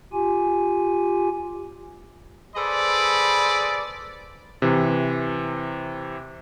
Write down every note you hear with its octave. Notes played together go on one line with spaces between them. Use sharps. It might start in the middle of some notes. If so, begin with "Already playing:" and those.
F4 G4 G#5
G#4 A4 B4 C5 D5 B5
C3 E3